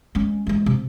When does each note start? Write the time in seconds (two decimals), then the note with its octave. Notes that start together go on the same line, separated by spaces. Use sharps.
0.15 G#3 C#4
0.47 E3 G#3
0.66 C3